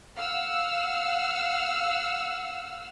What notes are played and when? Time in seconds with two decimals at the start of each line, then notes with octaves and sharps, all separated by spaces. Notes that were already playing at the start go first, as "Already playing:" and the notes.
0.15 F5 F#5 E6 F6